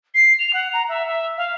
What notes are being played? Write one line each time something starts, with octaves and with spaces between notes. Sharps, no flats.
C7
F7
F#5
A#5
E5
E5
F5